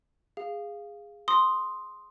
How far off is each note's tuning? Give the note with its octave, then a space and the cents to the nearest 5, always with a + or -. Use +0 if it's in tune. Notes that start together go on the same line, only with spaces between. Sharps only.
G#4 -10 F5 +0
C6 +0 D#6 +0